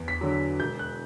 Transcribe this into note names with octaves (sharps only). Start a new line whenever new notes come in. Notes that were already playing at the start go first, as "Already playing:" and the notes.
Already playing: E2
B6
D3 F#3
E1 G6
F#6